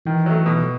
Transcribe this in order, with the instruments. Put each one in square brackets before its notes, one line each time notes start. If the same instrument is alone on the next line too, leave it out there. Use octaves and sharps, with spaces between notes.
[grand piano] D#3 [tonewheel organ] E3
[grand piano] F#3 A3
B2